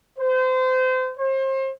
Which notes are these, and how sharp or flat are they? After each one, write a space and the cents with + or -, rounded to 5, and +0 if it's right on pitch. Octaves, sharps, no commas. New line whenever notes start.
C5 -30
C5 +35